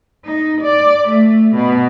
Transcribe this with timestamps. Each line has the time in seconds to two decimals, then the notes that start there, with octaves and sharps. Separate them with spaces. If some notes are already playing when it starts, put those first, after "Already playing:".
0.25 D#4
0.61 D5
1.09 A3
1.55 B2